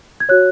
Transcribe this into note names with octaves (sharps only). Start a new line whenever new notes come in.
G#6
F#4 C#5 F#6